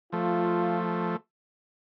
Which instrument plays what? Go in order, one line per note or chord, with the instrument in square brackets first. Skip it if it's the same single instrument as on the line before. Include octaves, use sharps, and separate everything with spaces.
[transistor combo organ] F3 A3 [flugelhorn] F4